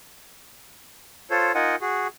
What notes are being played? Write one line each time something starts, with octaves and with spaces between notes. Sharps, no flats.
F4 A4 C5 C#5
D#4 F4 A#4 D#5 F#5 G#5
F#4 G#4